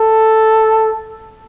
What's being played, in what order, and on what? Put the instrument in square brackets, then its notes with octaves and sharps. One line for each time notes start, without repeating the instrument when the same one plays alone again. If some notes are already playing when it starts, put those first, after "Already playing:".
Already playing: [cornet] A4